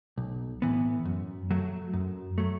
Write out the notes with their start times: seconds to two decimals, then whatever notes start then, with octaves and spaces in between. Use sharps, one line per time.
0.18 B1
0.62 A2 E3 B3
1.05 F#2
1.51 F#3 A3
1.93 F#2
2.38 F#3 A3